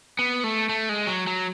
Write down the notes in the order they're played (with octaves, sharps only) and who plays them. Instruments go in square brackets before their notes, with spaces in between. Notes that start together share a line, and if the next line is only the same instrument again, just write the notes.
[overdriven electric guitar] B3
A3
A3
G#3
F#3
F#3